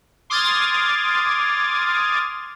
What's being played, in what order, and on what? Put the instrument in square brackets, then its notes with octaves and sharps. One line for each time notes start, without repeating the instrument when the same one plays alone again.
[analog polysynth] C6 D6 D#6 F6 G#6 A6